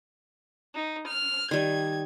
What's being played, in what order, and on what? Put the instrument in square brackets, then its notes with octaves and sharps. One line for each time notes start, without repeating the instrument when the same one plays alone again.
[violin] D#4
F6
[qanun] D#3 G3 [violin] G#6